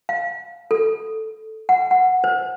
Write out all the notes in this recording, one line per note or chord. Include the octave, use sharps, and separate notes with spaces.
F5
A4
F#5
F#5
C5